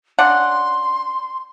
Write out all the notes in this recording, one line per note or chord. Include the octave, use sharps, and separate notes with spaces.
C#3 D4 F#5 C6